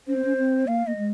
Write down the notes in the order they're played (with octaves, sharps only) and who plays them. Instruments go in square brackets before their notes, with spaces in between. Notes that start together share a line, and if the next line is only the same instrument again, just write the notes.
[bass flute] C#4 [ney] C5
[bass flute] C4
C#4
C4
[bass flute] A#3 [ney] F5
[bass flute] A#3 [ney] D#5
[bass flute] G#3